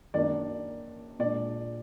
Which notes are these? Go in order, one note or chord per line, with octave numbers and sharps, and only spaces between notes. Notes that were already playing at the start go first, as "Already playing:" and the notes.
F#2 D#3 A#3 D4 D5
A#2 G#3 D4 D5